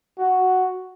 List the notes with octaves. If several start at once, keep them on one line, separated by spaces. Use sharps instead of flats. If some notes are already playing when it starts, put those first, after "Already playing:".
F#4